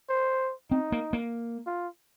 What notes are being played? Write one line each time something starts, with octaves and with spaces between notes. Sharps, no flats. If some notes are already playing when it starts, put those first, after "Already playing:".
C5
C4 D#4
A#3
A#3
F4